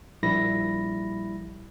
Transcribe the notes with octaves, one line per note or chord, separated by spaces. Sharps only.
A#1 G3 E4 B5 A#6